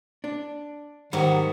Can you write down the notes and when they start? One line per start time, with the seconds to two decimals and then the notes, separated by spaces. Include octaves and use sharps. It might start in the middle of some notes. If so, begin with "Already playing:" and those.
0.24 D4
1.13 G#2 D#3 F#3 G3 F#5